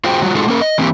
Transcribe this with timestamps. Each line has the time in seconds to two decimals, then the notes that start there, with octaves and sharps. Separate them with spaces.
0.04 F4 F#4 G#4 C5 G5
0.22 F#3 G3 F4 F#4
0.35 G#3 D#4 F4 F#4 G#4 A4
0.48 A#3 C#4 A#4
0.61 D#5
0.78 E3 A#3 C4 C#4 E4 G4